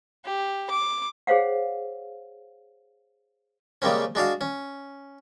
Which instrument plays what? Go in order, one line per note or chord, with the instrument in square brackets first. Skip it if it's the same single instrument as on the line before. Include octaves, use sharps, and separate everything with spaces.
[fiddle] G4
D6
[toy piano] G#4 C5 C#5 F5 F#5
[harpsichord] C#3 G3 G#3 A#3 C4 C#4
G#3 D4 F#4 F5
C#4